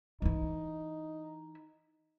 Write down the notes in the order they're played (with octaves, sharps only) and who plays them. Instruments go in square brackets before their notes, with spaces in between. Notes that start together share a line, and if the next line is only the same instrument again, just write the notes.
[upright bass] E3 E4 [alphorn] D#4